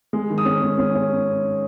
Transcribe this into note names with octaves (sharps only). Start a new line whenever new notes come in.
G#3
D#3
D#6
C#4
G#3
C#4
C#4